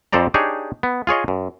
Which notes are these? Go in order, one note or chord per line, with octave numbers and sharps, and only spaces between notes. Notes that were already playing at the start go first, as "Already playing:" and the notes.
F2 A4 C5 D5 A#5
D4 D#4 G4 G#4 C#5
B3
F4 G#4 C#5 D#5
F#2